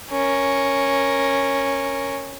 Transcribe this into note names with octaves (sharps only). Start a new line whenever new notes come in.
C#4 A#4